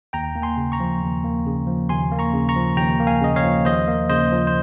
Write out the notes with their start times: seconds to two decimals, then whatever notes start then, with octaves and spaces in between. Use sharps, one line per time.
0.13 D#2 G5 A#5
0.36 A#3
0.42 G#5 C6
0.57 C#3
0.72 A#5 C#6
0.80 F3
1.02 D#2
1.24 A#3
1.46 C#3
1.67 F3
1.89 D#2 G#5 C6
2.12 A#3
2.19 A#5 C#6
2.33 C#3
2.49 A#5 C#6
2.56 F3
2.77 D#2 G5 A#5
3.00 A#3
3.07 F5 G#5
3.21 C#3 D#5
3.36 C#5 F5
3.43 F3
3.65 D#2 C5 D#5
3.88 A#3
4.09 C#3 C5 D#5
4.32 F3
4.47 C5